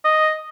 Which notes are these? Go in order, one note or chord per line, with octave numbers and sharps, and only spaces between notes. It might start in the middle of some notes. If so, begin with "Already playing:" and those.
D#5